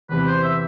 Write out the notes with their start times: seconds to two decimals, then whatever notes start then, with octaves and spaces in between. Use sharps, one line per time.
0.09 E2 C3 E3 B4
0.27 C5
0.44 E5